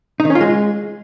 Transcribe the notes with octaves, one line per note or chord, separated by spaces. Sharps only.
D#4
D#3
C#4
F4
G#3